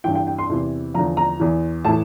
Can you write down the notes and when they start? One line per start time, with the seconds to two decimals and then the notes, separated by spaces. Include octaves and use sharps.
0.04 G2 E3 G5
0.15 G5
0.27 G5
0.38 C6
0.50 E2 C3 E3
0.94 E2 D3 F3 A#5
1.17 A#5
1.40 E2 E3
1.85 A2 E3 A5